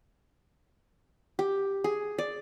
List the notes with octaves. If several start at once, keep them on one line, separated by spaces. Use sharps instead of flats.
G4
G#4
D5